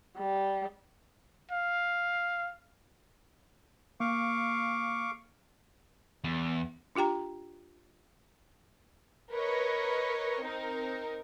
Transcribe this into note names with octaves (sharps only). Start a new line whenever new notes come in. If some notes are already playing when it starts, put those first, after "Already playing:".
G3
F5
A#3 F5 C#6 D6
E2
D4 F4 G4 G5 A#5
A#4 B4 C#5 D#5
C4 D#4 A#4